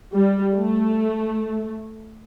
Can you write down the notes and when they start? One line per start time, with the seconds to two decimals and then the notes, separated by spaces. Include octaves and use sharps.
0.14 G3
0.55 A3